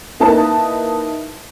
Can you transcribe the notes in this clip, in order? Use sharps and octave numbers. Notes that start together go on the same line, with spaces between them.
A#3 D#4 E4 B4 A5